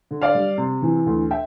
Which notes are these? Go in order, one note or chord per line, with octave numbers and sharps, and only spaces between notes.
D3
D5 F5
G3
C3
E3
D2
E5 G5